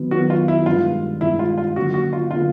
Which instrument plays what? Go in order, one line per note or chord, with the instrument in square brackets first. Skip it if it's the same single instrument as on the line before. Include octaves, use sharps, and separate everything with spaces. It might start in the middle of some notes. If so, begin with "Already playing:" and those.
Already playing: [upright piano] D#3 F#3 B3
[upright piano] D#3 [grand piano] F#4
[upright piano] F#3 B3
[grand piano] F4
E4
[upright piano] G2 D#3 G#3 [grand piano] F4
[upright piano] G2 D#3 G#3 [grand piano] E4
[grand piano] F4
F4
[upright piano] F#2 D3 F#3 A#3 [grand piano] F#4
[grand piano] F#4
F4
[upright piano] D3 F#3 A#3 [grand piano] F4